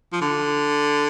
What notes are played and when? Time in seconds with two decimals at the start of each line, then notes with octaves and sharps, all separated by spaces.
0.13 F3
0.21 D3